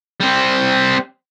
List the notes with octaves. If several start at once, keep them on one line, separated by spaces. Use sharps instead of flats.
G3 C4